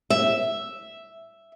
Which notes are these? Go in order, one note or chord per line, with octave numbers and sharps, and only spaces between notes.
E5